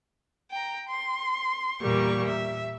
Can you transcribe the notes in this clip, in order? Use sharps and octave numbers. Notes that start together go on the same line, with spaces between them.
G5 A#5
C6
E2 A#2 G3 A#3 C#6
E5